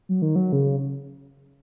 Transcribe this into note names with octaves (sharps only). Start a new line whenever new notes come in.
F#3
D#3
F#3
C#3